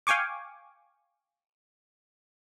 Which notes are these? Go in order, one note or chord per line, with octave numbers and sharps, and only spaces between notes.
F5 G5 G#5 C#6 D6